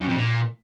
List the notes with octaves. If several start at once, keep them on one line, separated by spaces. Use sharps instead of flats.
F#2
F2
A#2